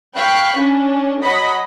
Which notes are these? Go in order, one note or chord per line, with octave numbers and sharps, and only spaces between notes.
F5 G5 B5 C#6 F#6
C#4 D4
F#3 D#5 F#5 B5